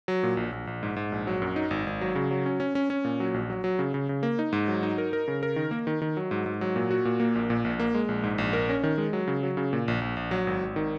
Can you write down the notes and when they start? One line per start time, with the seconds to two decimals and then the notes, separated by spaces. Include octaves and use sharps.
0.08 F#3
0.23 A#2
0.37 A#1
0.52 A#1
0.67 A#1
0.83 G#2
0.96 G#2
1.12 A#1
1.27 F#3
1.42 F#2
1.56 D#4
1.71 G#1
1.87 G#1
2.01 F#3
2.15 C#3
2.31 F#3
2.46 C#4
2.60 C#4
2.75 C#4
2.90 C#4
3.05 A#2
3.20 F#3
3.34 A#1
3.50 F#3
3.64 F#3
3.79 C#3
3.94 C#3
4.09 C#3
4.23 A#3
4.39 D#4
4.53 G#2
4.68 F#3
4.83 D#4
4.98 A#4
5.13 A#4
5.28 C#3
5.43 A#4
5.56 D#3
5.71 A#3
5.87 D#3
6.02 D#3
6.17 F#3
6.31 G#2
6.46 G#2
6.61 F#3
6.76 A#2
6.91 F#4
7.05 A#2
7.20 A#3
7.36 A#1
7.50 A#2
7.65 A#1
7.80 A#3
7.94 G#3
8.09 A#1
8.23 G#2
8.38 A#1
8.53 A#4
8.69 C#4
8.83 D#3
8.98 G#3
9.13 F#3
9.28 C#3
9.43 F#3
9.57 C#3
9.73 A#2
9.88 A#1
10.01 A#1
10.17 A#1
10.31 F#3
10.47 G#1
10.61 G#1
10.76 D#3